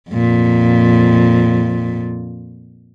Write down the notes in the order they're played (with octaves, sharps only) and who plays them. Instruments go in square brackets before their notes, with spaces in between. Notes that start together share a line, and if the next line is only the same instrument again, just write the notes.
[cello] F2 A#2